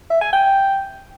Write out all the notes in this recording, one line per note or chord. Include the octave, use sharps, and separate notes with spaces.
E5
G#5
G5